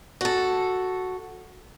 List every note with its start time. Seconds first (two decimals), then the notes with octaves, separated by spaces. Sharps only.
0.21 F#4 A4